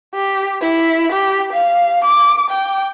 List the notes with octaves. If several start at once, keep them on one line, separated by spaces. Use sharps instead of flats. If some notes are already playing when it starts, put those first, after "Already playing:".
G4
E4
G4
F5
D6
G5